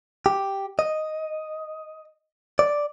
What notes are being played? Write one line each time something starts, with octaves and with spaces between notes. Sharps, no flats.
G4
D#5
D5